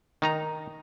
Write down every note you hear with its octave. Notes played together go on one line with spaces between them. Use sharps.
D#3 D#4 A#5